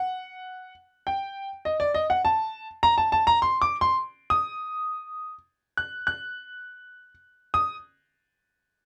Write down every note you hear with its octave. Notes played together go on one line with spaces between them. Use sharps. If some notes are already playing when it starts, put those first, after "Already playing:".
Already playing: F#5
G5
D#5
D5
D#5
F#5
A5
A#5
A5
A5
A#5
C6
D6
C6
D#6
F#6
F#6
D#6